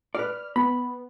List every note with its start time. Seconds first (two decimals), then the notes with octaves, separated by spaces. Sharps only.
0.15 B4 D5 F6
0.56 B3 B5